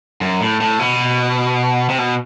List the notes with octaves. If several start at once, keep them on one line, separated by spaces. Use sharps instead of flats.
F#2
A2
A2
B2
C3
B2